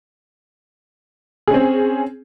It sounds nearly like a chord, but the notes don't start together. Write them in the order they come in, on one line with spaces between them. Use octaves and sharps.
G#4 C#4 C4